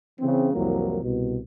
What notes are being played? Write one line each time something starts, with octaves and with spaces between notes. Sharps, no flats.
C#3 E3 C4
C2 F2 E3 F#3 A#3 A#4
C2 B2